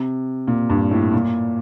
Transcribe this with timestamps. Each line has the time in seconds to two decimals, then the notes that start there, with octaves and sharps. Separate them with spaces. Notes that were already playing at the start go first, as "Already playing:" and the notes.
Already playing: C3
0.48 A#2
0.70 G2
0.91 A2
1.13 A#2